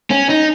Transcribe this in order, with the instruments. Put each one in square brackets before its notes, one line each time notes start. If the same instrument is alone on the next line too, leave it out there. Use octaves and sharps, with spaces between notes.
[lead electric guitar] C#4
D#4